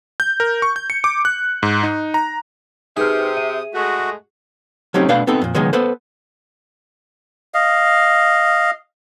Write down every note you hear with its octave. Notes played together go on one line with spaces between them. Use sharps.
G6
A#4
C#6
G6
C#7
D6
F#6
G#2
D#4
A#5
C3 D#4 G#4 B4 D#6 F6
E5 D#7
G#3 A3 F#4
F#3 A3 C4 C#4 D#4 G4
B2 A3 D4 B4 F5 G5
B3 C4 D#4 A4
F2 A#2
C#2 D#3 F#3 G#3 B3
B3 A4 B4 C5
D#5 F5